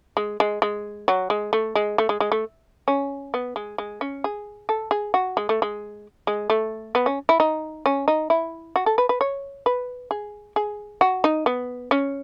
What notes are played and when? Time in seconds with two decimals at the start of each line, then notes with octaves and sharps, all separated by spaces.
0.17 G#3
0.40 G#3
0.62 G#3
1.08 F#3
1.30 G#3
1.53 A3
1.75 G#3
1.98 A3
2.09 G#3
2.20 G#3
2.32 A3
2.88 C#4
3.34 B3
3.56 G#3
3.78 G#3
4.01 C#4
4.24 G#4
4.69 A4
4.91 G#4
5.14 F#4
5.37 G#3
5.49 A3
5.62 G#3
6.27 G#3
6.50 A3
6.95 B3
7.06 C#4
7.29 E4
7.40 D#4
7.86 C#4
8.08 D#4
8.30 E4
8.76 F#4
8.86 A4
8.98 B4
9.09 B4
9.21 C#5
9.66 B4
10.11 G#4
10.56 G#4
11.01 F#4
11.24 D#4
11.46 B3
11.91 C#4